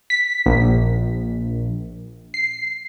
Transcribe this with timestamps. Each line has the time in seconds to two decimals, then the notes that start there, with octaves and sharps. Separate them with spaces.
0.10 B6
0.46 A#1
2.34 C7